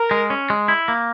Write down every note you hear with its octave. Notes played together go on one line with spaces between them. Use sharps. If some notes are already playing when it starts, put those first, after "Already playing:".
Already playing: A#4
G#3
C#4
G#3
E4
A#3